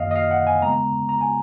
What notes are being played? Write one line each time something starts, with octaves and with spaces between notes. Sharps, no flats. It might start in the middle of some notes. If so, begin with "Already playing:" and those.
Already playing: F#2 D#3 A#3 D#5 F5
D#5
F5
F#5
G#5
C#3 G#3 B3 A#5
A#5
G#5